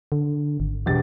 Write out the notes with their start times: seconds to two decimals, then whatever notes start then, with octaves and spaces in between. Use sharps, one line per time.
0.12 D3
0.60 G#1
0.86 E1 G4 A6